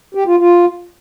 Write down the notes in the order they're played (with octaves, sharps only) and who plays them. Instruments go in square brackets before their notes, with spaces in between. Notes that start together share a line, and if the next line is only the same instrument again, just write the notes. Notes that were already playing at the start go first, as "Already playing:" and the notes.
[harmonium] G4
F4
F4